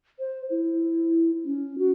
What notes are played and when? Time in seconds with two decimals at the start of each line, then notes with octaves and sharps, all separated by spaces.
0.19 C5
0.50 E4
1.45 C#4
1.78 F#4